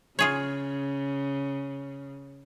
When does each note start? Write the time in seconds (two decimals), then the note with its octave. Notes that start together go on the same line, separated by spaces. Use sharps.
0.19 C#3 F4 G#4 C#5